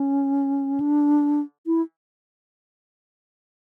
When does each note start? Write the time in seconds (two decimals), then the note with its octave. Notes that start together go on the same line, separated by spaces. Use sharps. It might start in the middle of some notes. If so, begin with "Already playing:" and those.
Already playing: C#4
0.80 D4
1.66 E4